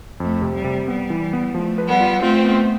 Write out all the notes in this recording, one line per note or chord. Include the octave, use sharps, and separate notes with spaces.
F2 A3
C3
G3
C3
G3 B3
E3
B3
F3 A3
B4
G3 B3
F4
A3 C4 F4
B3